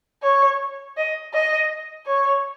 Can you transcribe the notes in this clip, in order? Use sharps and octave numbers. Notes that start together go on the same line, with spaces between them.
C#5
D#5
D#5
C#5